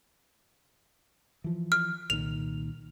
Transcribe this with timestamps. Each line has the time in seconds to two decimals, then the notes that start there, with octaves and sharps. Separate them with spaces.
1.44 E3 F3
1.72 F6
2.10 C2 A#2 D#3 F7